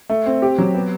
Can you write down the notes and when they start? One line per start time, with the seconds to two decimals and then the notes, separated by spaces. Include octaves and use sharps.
0.09 A3
0.26 C4
0.42 G4
0.58 F#3
0.75 B3